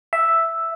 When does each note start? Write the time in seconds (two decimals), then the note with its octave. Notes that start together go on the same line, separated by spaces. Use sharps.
0.13 E5